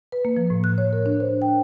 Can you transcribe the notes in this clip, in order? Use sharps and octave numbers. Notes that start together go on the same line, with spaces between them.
B4
A#3
F3
A2
F#6
C#5
A#4
D4
C5
G5